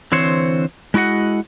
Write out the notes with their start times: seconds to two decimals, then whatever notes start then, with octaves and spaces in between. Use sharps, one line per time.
0.12 D3 E3 C4 C5 C#5
0.94 G#3 E4 F#4 D#5 F#5